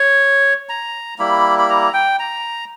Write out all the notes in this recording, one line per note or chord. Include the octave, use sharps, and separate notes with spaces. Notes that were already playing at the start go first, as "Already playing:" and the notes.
Already playing: C#5
A#5
G3 A#3 E4 B5
B5
A#5
G5
A#5